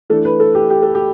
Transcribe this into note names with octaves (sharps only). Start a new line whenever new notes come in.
E3 A3 D4 A4
B4
A4
G4
G4
A4
G4